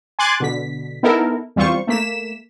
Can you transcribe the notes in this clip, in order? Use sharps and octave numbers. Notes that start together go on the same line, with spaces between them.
G#5 C6 D6 F#6 G#6 A6
B2 D3 B6
B3 D#4 E4 A4 A#4
E2 G3 C4 F4 C5 C#6
A3 A#3 B6 E7